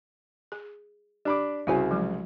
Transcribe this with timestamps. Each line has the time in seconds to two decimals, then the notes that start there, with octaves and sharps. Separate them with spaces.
0.52 G#4
1.25 D4 G4 B5 D6
1.67 C2 C#3 E4 F#4 C5 G#5
1.91 F3 F#3 G#3